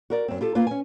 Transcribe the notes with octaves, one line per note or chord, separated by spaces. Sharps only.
F#4 A#4 D5
F#2 C4
F4 G4 A4
A#3 F4 B4
C#4 G#5